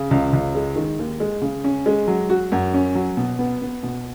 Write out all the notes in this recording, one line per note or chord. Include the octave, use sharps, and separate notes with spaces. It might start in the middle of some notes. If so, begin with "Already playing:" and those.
Already playing: C#3
C#2
C#2
G#3
D#3
D#2
G#3
C#3
C#4
G#3
F#3
F#4
F#2
C#4
F#3
B2
B3
B3
B2